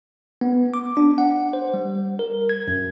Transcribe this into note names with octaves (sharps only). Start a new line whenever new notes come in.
B3
D6
D4
F#5
C5
G3
A#4
G#6
F#2